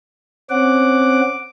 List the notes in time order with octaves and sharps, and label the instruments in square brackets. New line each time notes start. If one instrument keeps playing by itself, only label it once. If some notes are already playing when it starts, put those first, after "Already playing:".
[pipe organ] C4 C#4 F#5 [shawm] D6